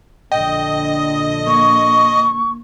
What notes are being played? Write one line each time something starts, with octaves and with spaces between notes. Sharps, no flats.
A#1 D3 D#5 G5
A#3 C#6